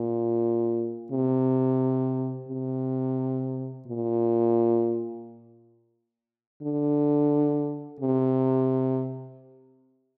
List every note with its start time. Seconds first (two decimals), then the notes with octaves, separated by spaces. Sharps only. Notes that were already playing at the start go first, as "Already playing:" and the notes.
Already playing: A#2
1.12 C3
2.49 C3
3.87 A#2
6.63 D3
8.00 C3